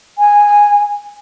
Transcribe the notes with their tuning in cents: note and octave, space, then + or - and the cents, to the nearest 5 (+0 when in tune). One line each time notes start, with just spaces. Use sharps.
G#5 -10